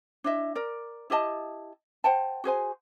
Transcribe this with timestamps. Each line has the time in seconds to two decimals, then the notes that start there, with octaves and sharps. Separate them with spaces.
0.24 D4 E4 D#5 E5
0.55 A#4 D5
1.10 E4 G4 D#5 A5
2.04 C5 F#5 G5 A5
2.44 F#4 G#4 C5 G#5